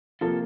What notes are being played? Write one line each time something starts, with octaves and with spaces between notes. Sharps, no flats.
C3 F3 A#3 F4 A4